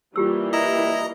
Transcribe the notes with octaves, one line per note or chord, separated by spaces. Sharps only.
E3 G3 A#3 F4 G4 E6
E4 D#5 A#5